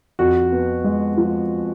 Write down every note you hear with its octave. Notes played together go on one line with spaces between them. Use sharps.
F2 F#4
B3
G#3
F3